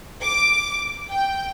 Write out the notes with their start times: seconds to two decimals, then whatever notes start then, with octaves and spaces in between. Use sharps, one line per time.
0.21 D6
1.10 G5